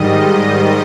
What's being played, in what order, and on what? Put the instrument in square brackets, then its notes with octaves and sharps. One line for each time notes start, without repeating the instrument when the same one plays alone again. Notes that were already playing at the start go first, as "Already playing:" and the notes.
Already playing: [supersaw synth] G#2 D#3 G3 D#5